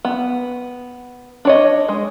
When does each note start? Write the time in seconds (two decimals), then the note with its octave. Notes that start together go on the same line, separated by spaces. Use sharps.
0.05 B3
1.45 D4 C#5 D#5
1.89 G#3